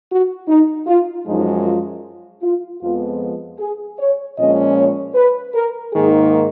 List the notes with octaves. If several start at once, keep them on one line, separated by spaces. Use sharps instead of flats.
F#4
D#4
F4
F#2 F3 G#3 D#4
F4
F4
F2 F3 G#3 B3 F4
G#4
C#5
A#2 F3 G#3 C#4 D#5
C#5
B4
A#4
G#2 D#3 A#3 G#4